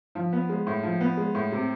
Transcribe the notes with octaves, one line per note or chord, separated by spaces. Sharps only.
F3
B3
G#3
A2
F3
B3
G#3
A2
C3